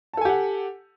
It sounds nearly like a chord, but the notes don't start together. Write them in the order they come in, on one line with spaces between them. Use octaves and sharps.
A5 A4 G#5 G4 F#5